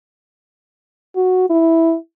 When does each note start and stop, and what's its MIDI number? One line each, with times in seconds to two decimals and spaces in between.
1.16 1.45 66
1.50 1.95 64